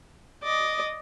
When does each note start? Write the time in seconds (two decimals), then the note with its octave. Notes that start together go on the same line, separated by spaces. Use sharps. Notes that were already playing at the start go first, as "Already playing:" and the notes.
0.44 D5 D#5